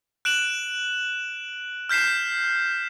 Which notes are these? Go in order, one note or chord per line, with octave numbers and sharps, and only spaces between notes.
F#6 D7 E7 F#7
F6 G6 B6 C7 E7